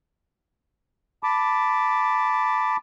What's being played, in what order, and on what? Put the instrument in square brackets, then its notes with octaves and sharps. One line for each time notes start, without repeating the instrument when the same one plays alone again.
[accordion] A5 B5 D6